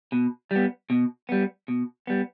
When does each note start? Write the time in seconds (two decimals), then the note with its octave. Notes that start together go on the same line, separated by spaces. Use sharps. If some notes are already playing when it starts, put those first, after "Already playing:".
0.12 B2
0.51 G3 B3
0.90 B2
1.29 G3 B3
1.68 B2
2.07 G3 B3